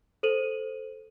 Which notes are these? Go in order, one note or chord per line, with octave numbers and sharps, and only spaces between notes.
A4 C5 D#7 F#7